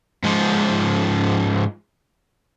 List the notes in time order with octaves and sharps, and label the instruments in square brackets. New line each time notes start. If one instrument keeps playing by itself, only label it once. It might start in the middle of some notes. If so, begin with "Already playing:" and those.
[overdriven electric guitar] G#2 F3